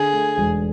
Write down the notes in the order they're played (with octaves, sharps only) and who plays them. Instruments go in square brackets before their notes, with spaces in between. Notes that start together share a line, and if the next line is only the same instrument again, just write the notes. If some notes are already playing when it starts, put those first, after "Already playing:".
Already playing: [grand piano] D3 [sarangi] G#4
[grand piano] A3
E1